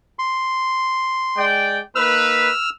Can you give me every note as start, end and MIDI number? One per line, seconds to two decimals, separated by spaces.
0.19 1.45 84
1.37 1.80 56
1.37 1.80 74
1.37 1.80 79
1.95 2.49 58
1.95 2.49 63
1.95 2.49 71
1.95 2.70 88
1.95 2.70 89